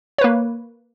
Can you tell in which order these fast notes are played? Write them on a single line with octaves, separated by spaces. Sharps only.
C#5 B4 A#3